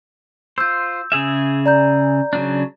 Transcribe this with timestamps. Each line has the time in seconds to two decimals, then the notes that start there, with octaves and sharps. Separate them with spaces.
0.58 F4 C5 E6 G6
1.12 C#3 G#4 E5
1.66 D5 A#5 G6
2.33 C#3 F#3 D4